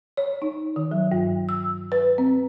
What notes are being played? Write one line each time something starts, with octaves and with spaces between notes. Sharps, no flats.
C#5
D#4
D#3
F#3
G2
E6
B4
C4